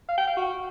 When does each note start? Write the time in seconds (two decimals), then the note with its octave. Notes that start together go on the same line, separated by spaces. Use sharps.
0.09 F5
0.18 G5
0.27 F5
0.37 F#4